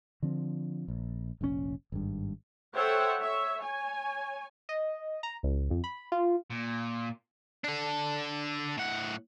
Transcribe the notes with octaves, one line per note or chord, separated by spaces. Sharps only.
D3 F3 C4
A#1
F1 A#1 B2 C#4
G#1 G2
A4 C5 C#5 E5 F#5 G5
C#5 E5
C#5 G#5
D#5
A#5
C#2
F2
B5
F4
A#2
D4 A4
A2 F#5